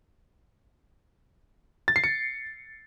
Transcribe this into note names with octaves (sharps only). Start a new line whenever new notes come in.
A6
C7
C#7